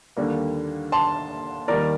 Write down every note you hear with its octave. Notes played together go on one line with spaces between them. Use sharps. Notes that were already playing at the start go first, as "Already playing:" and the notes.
D#2 D3 G3 A#3
A5 C6
D#2 D#3 G3 A#4 D5